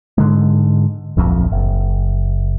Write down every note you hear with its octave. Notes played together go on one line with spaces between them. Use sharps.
G#2 D3 G#3
D1 A#1 F2
F#1